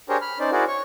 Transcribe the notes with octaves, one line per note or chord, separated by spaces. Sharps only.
D4 G4 G#4 A#4 C5 C#5
B5 F6
C#4 D#4 C5 D5
E4 F#4 G#4 A#4 C5 D5
C#5 C#6